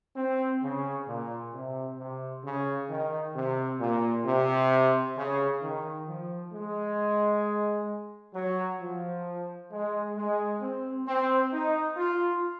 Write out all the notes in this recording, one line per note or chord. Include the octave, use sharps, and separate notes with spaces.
C4
C#3
A#2
C3
C3
C#3
D#3
C3
A#2
C3
C#3
D#3
F3
G#3
F#3
F3
G#3
G#3
C4
C4
D#4
F4